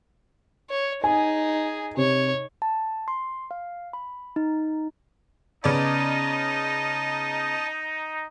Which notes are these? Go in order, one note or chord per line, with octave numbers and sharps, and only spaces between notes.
C#5
D#4 G#4 G#5
C3 C#5
A5
C6
F5
B5
D#4
C#3 B3 D#4 D5 D#5 A5